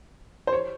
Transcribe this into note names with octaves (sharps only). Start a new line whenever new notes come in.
C5
C#5